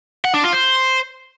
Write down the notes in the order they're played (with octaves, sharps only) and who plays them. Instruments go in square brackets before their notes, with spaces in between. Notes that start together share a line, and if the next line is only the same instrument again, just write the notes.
[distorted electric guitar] F#5
D4
F4
C5